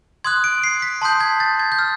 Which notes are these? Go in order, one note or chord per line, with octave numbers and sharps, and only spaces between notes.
C6 D#6 F#6 G#6
D7
C7
B6
A5 C6 D#6 G6
G#6
A6
G#6
G6
F6